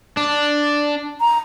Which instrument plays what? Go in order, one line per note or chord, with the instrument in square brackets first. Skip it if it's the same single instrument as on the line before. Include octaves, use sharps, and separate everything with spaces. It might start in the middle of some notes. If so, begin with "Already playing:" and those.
[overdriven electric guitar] D4
[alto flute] A#5